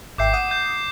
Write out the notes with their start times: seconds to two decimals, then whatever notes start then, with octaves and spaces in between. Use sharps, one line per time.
0.18 G#1 E5 G5 D6 G6 C7
0.33 F#5 D#6
0.51 G6